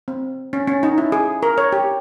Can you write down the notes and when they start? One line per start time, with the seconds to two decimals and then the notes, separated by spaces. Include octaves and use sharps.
0.08 C4
0.53 C#4
0.67 C#4
0.83 D#4
0.98 E4
1.12 G#4
1.43 A#4
1.58 C#5
1.73 G4